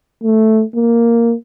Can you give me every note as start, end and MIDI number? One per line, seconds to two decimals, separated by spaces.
0.23 0.63 57
0.75 1.34 58